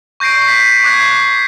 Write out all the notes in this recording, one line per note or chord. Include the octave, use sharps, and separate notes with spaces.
C#6 G6 A#6 C7 D7
B6
D6 F#6 G#6 A#6 C7